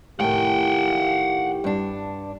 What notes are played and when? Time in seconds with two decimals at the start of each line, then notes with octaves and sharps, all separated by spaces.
0.20 A2 D#3 G4 F#5 G5
1.64 G2 D4